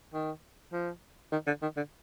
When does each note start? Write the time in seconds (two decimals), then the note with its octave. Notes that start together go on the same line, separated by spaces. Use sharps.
0.13 D#3
0.72 F3
1.32 D#3
1.47 D3
1.62 D#3
1.77 D3